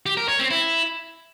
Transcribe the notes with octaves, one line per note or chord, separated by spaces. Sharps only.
G4
A#4
C#5
C4
E4